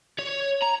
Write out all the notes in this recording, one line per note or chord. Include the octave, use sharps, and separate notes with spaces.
C#5
A#5